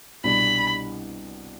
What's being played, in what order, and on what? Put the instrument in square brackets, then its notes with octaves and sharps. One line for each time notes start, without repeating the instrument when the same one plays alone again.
[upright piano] C2 B2 G3 D4 [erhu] B5